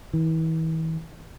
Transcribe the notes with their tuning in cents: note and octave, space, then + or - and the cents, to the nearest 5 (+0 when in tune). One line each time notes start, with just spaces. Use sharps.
E3 -40